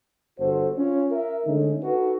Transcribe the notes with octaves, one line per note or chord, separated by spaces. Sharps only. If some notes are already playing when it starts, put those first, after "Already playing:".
G1 F#4 A4 C5
C#4 F4 C#5
A#4 E5
D3 G#3 A3 C#4 D#4
D#4 F#4 A4 B4